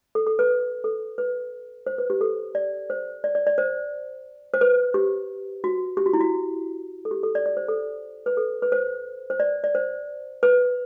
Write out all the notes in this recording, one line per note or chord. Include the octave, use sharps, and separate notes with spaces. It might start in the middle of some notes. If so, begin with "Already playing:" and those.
A4
A4
B4
A4
B4
C5
B4
G4
A4
D5
C5
D5
D5
D5
C5
C5
B4
G4
F#4
G4
F#4
E4
F#4
A4
G4
A4
D5
D5
C5
A4
B4
A4
B4
C5
C5
D5
D5
C5
B4